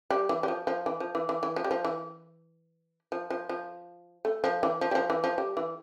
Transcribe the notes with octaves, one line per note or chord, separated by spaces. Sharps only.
G3
E3
G3
F3
F3
E3
F3
E3
E3
E3
F3
G3
F3
E3
F3
F3
F3
A3
F3
E3
F3
G3
F3
E3
F3
G3
E3